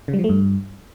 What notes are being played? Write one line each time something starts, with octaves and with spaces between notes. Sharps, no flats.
C#3
G3
F3
A3
G2